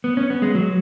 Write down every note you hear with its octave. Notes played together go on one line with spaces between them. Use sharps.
B3
C#4
B3
G#3
F#3